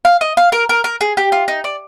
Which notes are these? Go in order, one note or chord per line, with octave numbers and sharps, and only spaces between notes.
F5
D#5
F5
A#4
A#4
A#4
G#4
G4
F4
D#4
D5